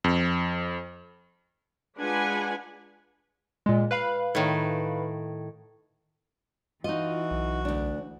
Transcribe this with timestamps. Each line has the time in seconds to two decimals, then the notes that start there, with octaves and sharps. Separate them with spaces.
0.04 F2
1.95 G#3 D4 F4 B4 F#5 G#5
3.66 A#2 G#3
3.91 B4 F5 B5
4.35 A2 D#3
6.84 E3 D#4 F4 F#4 D#5
7.31 B1
7.65 D2 D4